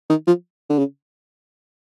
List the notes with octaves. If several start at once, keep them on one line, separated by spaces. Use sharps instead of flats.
D#3
F3
D3
C#3